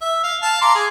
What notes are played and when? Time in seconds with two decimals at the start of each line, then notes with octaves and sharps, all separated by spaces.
0.01 E5
0.23 F5
0.42 F5 A5
0.62 A#5 C6 D6
0.75 G#4